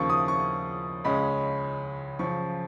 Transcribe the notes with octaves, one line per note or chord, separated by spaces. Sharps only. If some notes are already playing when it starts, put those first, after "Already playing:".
Already playing: D#2 C#3 F3 A#3 C#6
D#6
C#6
C#2 C#3 G#3 C#4 B5
F#2 C#3 F3 C#6